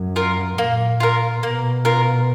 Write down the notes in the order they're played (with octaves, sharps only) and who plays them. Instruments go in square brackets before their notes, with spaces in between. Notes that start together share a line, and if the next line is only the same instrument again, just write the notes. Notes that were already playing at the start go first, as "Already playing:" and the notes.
Already playing: [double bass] F#2
[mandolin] F4 A#4
[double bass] A#2 [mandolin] A#3
[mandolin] F4 A#4
[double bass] B2 [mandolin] A#3
[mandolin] F4 A#4